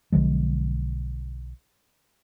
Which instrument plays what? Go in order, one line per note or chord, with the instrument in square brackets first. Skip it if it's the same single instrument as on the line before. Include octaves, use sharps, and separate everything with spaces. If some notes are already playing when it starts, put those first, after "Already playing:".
[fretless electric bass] B1 D3 F3 G#3